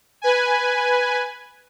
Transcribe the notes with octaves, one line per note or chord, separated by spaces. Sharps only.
B4 G#5